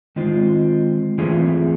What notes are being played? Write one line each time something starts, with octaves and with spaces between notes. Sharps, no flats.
D#3 G#3 C4 F4
E3 A3 C4 F4 G#4